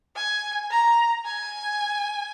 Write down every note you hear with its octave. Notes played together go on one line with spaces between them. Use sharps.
G#5
A#5
G#5